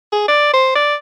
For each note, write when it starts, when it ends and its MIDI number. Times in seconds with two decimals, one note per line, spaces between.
0.12 0.23 68
0.28 0.49 74
0.53 0.72 72
0.75 0.95 74